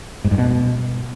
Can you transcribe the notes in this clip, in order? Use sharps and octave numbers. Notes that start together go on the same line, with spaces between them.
G#2
G2
B2